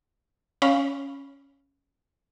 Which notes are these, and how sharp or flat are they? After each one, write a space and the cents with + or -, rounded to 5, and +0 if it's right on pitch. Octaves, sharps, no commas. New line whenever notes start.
C#4 +0 F5 +0 B5 +0